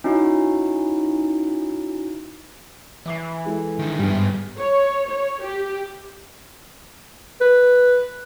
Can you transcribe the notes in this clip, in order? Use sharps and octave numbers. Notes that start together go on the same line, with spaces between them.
C#4 D#4 E4 F#4
E3 E5 D6 C7
G#3 E4 A4
D3 D#3
G2 G3 B3 G4 F6
G#2
C#5
C#5
G4
B4